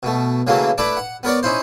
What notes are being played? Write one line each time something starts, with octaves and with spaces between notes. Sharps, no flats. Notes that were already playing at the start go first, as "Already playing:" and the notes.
B2 A3
C#3 E3 F#3 A3 A#3
A3 D4 E4 B4 D6
F#5
B3 A#4 C#5 D5
C#4 D#4 E4 C5